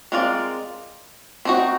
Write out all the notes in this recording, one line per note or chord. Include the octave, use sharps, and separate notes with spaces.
G#3 C4 F4 A#4 D5
C4 D#4 F#4